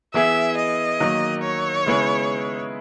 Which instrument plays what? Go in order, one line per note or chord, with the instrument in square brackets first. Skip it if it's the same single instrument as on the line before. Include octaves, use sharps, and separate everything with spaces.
[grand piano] E3 B3 E4 G#4 [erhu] E5
[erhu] D#5
[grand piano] D#3 F#3 A#3
[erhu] C#5
[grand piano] C#3 G#3 B3 E4 G#4